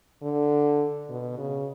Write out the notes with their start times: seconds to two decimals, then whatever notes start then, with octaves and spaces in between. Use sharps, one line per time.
0.22 D3
1.10 B2
1.38 C#3